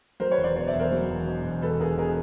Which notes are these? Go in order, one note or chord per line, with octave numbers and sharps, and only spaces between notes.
F#3 A#4 C5
B4 C#5
E1
C5 D5
B2 C5 D5
D5 E5
E2
A#4 C5
F#3
E1
B2
E2
E1 A4 B4
E1 G#4 A#4
B2 G#4 A#4